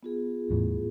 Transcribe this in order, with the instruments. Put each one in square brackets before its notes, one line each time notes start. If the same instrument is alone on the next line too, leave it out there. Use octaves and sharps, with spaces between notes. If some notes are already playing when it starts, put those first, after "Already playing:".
[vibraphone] B3 F4 G#4
[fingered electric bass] E2 A2